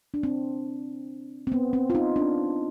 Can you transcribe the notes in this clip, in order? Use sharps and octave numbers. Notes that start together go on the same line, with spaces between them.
D4
C4
C4
B3
C4
F4
D#4
D4